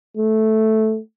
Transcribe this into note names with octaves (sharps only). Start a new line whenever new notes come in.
A3